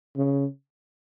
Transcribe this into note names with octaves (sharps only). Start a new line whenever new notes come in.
C#3